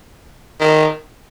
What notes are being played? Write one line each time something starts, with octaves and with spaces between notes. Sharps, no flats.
D#3